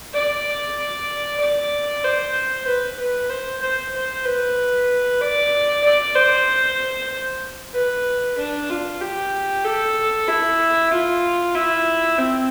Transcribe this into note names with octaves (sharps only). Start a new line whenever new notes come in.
D5
D5
C5
B4
B4
C5
C5
C5
B4
D5
D5
C5
B4
D4
F4
G4
A4
E4
F4
E4
C4